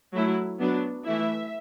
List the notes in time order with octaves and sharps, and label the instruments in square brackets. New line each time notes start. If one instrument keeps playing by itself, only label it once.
[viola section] F#3 A3 E4
F#3 B3 D4
E3 A3 E4 E5